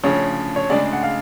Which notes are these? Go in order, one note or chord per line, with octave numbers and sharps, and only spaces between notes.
D2 C#3 F3 C#5
C#5
D2 C#3 G#3 D4 D5
F#5
F5